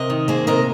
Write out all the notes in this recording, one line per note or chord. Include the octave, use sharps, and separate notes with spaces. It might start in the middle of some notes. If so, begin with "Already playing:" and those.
Already playing: C3 A#4 D#5
D#3
A#3 G#4 C5
C3 A#4 D#5